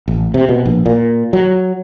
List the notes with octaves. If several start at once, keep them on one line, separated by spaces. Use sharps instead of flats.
A1
C3
B2
A#1
A#2
F#3